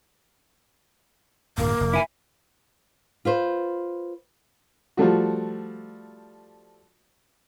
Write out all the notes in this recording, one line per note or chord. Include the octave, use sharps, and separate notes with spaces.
D1 G2 A#3
F1
E4 G#5
F4 B4 C5
F3 G3 A3 F#4